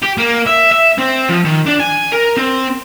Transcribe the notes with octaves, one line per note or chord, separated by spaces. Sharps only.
G4
A#3
E5
E5
C4
F3
D#3
D4
G#5
A#4
C4